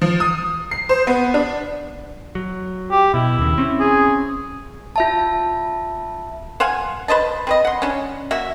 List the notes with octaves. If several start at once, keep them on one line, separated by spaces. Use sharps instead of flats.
F3
D#6
C7
C5
B3
D4
F#3
G4
B2 E4
D#2 C#3
C4 C#4
G#4
F4 E5 A5
C5 F5 F#5 G#5
B4 C5 D#5 A5
C4 B4 D#5
F#5 C6
C#4 D4
A#3 F#4 E5